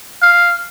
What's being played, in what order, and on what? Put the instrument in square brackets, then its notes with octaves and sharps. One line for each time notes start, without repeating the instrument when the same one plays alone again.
[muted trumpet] F5